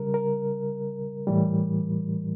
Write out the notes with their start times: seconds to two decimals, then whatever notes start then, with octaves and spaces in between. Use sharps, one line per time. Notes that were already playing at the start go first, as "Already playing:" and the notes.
Already playing: C#3 G3 A#4
0.14 A#4
1.27 A2 E3 G3